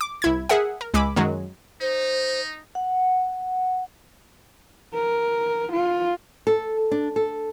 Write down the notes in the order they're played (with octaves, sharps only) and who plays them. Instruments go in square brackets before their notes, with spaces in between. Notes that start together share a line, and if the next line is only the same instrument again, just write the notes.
[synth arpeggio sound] D6
C2 E4 G#6
G#4 A#4 E5 F#5
A#4
C#2 G#3 G#5 B5 D6 E6
F#2 D#3 F#3 G#3
[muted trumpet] D#4 [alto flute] C5
[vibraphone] F#5
[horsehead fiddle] A#4
F4
[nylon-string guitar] A4
D4
A4